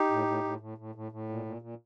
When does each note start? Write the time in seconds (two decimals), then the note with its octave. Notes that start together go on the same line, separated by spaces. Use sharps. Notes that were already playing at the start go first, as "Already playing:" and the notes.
Already playing: D#4 G4
0.11 A2
0.27 A2
0.44 A2
0.60 A2
0.78 A2
0.95 A2
1.12 A2
1.29 A#2
1.45 A#2
1.62 A#2